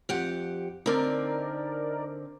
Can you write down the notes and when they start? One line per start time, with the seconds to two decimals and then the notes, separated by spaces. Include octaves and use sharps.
0.09 F2 G4 F#5
0.86 D3 C4 D#4 A#4 D5